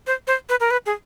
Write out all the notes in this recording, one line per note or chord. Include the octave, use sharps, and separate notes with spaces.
C5
C5
B4
A#4
B4
G#4